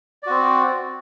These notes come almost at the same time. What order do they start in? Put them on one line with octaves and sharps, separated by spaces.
D5 F#4 C4